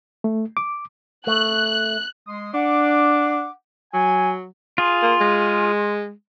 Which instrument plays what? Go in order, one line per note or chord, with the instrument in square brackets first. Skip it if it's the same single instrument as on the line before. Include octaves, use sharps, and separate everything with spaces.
[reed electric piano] A3
D6
[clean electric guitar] A3 [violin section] F#6
[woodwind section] G#3 C6 D#6
[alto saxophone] D4 [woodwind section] F#5 D6
[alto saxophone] F#3 [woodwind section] G#5
[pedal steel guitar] F4 G#4 [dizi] C6
[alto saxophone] A#3
G#3